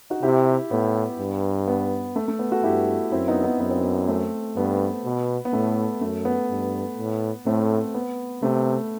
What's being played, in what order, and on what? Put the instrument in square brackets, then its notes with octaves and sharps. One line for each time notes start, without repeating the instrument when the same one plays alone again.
[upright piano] D#4 F#4
[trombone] C3 [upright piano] E4 G4
[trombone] A2 [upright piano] B3
[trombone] G2
[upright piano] B3
A3
A3
B3
F#4 A4
[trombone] G2 [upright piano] E4 G4
[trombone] F#2 [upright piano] C4 E4
[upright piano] B3 D#4
B3 D#4
[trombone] F#2 [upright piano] B3
[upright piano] C4
B3
A3 C4
[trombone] G2 [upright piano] B3
[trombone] B2
[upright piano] B3
[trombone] A2 [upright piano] A3
[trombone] F#2 [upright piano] A3
[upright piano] B3
[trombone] G2
A2
[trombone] A2 [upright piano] A3 C4
[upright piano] B3
[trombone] C3 [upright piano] A3